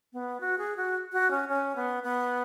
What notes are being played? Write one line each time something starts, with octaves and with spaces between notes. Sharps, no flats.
B3
F#4
G#4
F#4
F#4
C#4
C#4
B3
B3